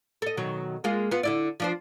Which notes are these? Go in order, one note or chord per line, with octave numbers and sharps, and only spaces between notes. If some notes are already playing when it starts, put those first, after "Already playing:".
A4 D#5
B2 D#3 F#3
G#3 A#3 F4
B3 F4
D3 E4 D5
F3 D4 C5